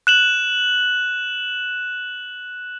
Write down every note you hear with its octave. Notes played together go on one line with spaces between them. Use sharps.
F#6 E7 F#7